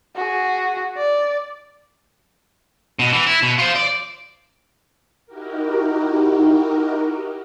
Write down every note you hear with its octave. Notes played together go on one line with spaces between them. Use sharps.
F#4 G#4
D5
B2
E3
E4
B2
F4 C5
D5
D#4 E4 F#4 G4 A#4